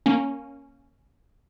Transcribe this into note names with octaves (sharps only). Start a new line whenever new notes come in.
A#3 C#4